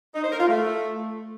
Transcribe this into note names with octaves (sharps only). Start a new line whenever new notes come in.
D#4
C5
A#4
F4
A3